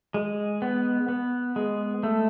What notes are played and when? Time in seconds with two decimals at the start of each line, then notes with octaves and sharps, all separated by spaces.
0.14 G#3
0.62 B3
1.09 B3
1.56 G#3
2.03 A3